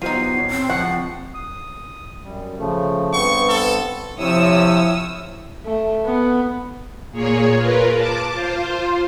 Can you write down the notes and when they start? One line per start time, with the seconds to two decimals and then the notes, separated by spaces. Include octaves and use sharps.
0.02 F#3 B3 D#4 F4 G4 C5 C7
0.36 D#1 C#5
0.50 C4
0.70 C#2 F3 F#5 C#6
1.34 D#6
2.24 F#2 G3
2.58 C#3 F3 A3
3.13 G2 B3 C4 C#6
3.49 A4
4.19 C3 F3 E4 C#5 D#6 E6
5.65 A3
6.06 B3
7.11 A#2 A#3 G#4 C#5
7.56 F4 A#4 B4
7.93 A5 D6
8.33 F4 C5